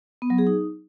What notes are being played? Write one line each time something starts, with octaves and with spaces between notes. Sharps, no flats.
B3
F#3
G#4
D#4